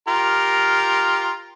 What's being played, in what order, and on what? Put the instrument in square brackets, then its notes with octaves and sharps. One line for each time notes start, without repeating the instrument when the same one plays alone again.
[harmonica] F4 G4 A#4